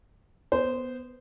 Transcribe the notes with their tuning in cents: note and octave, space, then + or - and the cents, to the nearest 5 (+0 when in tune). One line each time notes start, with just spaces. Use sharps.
B3 +0 C5 -15